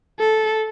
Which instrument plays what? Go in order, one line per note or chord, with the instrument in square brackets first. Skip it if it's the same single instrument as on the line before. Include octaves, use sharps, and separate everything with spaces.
[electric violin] A4